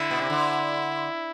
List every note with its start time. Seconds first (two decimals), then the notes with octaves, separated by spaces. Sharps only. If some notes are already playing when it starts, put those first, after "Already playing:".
Already playing: D3 E4
0.11 B2
0.21 C3
0.30 D3